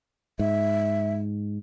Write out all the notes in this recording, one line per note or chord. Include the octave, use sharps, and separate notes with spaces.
G#2 E5